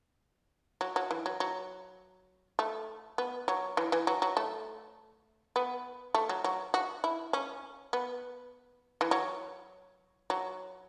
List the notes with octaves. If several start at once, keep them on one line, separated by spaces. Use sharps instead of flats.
F#3
F#3
E3
F#3
F#3
A3
B3
F#3
E3
E3
F#3
F#3
A3
B3
A3
F#3
F#3
F#4
E4
C#4
B3
E3
F#3
F#3